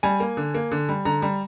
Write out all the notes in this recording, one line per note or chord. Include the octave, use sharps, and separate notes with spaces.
G3 G#5
A#3
D3
A#3
D3
G3
D3 A#5
G3